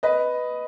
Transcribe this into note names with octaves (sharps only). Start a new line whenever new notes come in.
B4 D#5